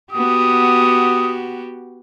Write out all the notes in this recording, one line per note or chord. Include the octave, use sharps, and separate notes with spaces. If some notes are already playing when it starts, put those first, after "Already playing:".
B3 F#4 G4 D#6